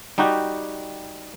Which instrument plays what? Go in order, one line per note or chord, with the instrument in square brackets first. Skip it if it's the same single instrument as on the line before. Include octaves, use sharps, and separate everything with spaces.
[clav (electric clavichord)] G3 D#4 F#4 G4